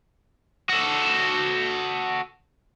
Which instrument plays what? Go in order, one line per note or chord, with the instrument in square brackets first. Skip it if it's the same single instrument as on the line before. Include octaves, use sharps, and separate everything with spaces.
[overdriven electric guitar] F#4 A4